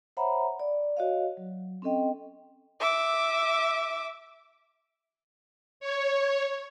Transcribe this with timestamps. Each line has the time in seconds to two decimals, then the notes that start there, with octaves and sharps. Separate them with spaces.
0.17 C5 C#5 E5 F#5 A#5 B5
0.60 D5
0.97 F#4 C#5 D#5 F5
1.37 F#3
1.82 C4 C#4 A4 D#5 G5
2.80 E5 D6
5.80 C#5